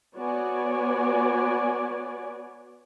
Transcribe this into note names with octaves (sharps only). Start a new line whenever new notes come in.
B3 F#4 C#5 D5 G#5